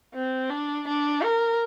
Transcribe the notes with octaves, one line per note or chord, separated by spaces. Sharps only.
C4
D4
D4
A#4